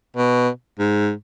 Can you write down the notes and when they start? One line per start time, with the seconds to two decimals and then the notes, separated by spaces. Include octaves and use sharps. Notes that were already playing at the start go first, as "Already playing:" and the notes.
0.17 B2
0.79 G#2